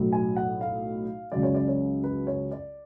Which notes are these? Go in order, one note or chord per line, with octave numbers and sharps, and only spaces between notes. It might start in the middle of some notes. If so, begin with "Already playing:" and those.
Already playing: B1 A2 F#3
G#5
F#5
F5
C#2 C#3 F#3 D5
C#5
D5
C#5
B4
C#5
D5